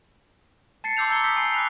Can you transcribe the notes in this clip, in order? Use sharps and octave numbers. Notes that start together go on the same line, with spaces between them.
A5 A6 C7 C#7
C6 D6 E6 G6 F7
A#5 E6 G#6 C#7 G7
D#6 G6 B6
G#5 B5 G6 C7
D6 F#6 F7